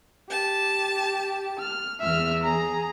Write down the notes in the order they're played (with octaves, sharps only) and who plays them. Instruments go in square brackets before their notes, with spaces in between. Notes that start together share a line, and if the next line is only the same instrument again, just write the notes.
[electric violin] G4 [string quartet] A5
[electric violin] F6
[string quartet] E2 [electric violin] E5 F6
[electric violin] G#4 A#5